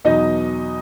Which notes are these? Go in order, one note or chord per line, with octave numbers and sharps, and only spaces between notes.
E2 B2 F#3 D#4 D#5